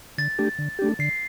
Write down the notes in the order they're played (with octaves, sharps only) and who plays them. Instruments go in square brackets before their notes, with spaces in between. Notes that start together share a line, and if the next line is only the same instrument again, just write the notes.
[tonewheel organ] D3 [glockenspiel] A6
[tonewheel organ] A3 D4 G4
D3
A3 D4 G4
[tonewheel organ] D3 [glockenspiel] C7